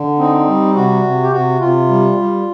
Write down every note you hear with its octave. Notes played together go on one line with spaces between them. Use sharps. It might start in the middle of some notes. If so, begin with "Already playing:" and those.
Already playing: D3
C4 D#4
G3
C3 F#4
C3
G4
C3 F#4
C3 F4
G3
G3